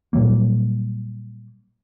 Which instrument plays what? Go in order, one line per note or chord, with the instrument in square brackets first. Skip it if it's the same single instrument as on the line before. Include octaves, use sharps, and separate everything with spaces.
[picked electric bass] A#2 F#3 G3 A#3